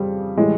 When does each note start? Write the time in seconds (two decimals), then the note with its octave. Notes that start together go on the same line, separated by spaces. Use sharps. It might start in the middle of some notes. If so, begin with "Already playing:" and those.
Already playing: F2 C#3 G3
0.37 A2 E3 G3 G#3